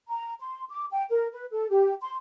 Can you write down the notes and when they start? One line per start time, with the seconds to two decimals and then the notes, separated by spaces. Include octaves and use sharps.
0.09 A#5
0.40 C6
0.69 D6
0.91 G5
1.09 A#4
1.32 B4
1.51 A4
1.70 G4
2.01 C6